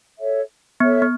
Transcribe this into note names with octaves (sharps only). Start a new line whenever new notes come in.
A4 C#5 E5
B3 A4 C#5 E5
B3